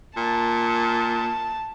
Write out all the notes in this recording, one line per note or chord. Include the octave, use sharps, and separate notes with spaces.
A#2 A5